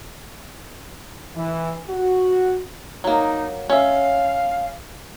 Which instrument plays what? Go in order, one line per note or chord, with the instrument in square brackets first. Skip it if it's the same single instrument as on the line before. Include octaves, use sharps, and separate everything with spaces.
[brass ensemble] E3
F#4
[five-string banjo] F#3 A#3 [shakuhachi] D#4
[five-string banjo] C#4 E5 [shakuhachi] F5